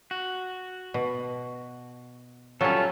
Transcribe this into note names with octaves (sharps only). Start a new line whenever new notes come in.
F#4
B2
F#3 G3 C#4 F4 A4